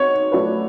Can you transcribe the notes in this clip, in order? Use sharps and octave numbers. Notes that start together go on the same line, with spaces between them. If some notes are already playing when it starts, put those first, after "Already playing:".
Already playing: C4 D#4 F#4 C#5
F#3 A3 D4 F#4 B4